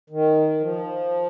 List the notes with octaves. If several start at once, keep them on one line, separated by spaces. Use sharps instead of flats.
D#3
F3